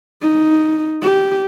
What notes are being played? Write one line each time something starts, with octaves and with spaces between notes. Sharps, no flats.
D#4
G4